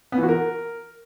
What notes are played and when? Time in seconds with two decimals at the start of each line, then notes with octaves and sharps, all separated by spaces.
0.12 B3
0.18 E3
0.23 F#4
0.29 A#4